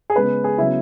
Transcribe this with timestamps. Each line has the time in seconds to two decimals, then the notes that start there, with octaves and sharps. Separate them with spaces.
0.10 G#4
0.16 C#3 G#3 B3 B4
0.44 G#4
0.58 C#3 F#3 B3 E4